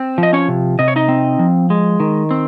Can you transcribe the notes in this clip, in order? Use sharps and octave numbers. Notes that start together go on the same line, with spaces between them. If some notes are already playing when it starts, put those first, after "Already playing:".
Already playing: C4
F3
D#5
C#4 C#5
C3
C3 D#5
C#5
D#4 D#5
C4
F3
G#3
D#3
C4